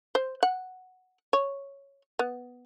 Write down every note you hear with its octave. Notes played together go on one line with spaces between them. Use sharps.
C5
F#5
C#5
B3